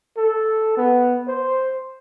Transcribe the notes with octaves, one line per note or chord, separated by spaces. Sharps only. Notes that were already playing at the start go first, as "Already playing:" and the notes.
A4
B3
C5